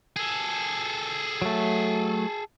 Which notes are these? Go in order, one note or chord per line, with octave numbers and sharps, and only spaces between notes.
G#4 A4
F#3 A3